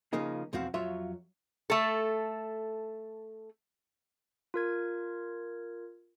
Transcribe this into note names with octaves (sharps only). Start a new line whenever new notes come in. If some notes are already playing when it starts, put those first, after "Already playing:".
C#3 F3 A#3 D#4 G#4
B1 E2 F3 C4 F#4 F5
F2 F#3 F4 C#5 E5 C6
A3 A4
F4 A#4 G#6